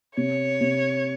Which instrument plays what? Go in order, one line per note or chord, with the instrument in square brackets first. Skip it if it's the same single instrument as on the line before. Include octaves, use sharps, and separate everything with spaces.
[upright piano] C3 [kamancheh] C#5
[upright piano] C3